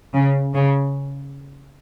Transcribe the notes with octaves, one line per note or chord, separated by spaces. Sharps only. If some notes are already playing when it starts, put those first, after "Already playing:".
C#3
C#3